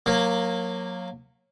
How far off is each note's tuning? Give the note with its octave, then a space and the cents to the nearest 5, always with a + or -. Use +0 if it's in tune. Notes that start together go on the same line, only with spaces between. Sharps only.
F#3 -25 A#3 +0